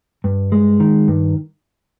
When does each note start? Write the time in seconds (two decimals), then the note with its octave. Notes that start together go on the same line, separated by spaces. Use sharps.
0.24 G2
0.52 G#3
0.80 D#3
1.08 G2